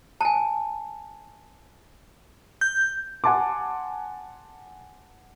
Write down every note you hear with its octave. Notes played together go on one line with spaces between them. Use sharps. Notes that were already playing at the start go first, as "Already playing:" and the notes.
G#5 A5
G6
F#5 G#5 A5 C6 D6